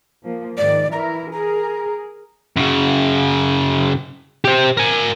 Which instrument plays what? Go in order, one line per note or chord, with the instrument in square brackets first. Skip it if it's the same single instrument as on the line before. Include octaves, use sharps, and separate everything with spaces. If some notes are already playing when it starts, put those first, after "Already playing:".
[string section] F3 A#3
[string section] G#2 D#3 [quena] D5
[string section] E3 E4 A#4 [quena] A#5
[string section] G#4 A#4 [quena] A#5
[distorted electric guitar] F#2 C#3
G4 C5
A#4 G#5